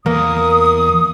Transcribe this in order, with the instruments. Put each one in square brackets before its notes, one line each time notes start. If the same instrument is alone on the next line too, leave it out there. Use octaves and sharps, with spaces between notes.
[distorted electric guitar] E2 [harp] A#3 [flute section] D#6